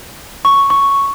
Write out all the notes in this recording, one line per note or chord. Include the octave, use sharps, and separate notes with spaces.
C#6
C#6